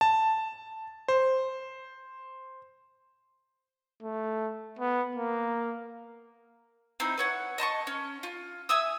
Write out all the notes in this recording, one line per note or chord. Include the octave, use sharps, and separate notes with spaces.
A5
C5
A3
B3
A#3
C4 D#4 E4
B4 C#5 F#5
D#5 A5 C6 C#6
C#4
F4
E5 G#5 D#6 E6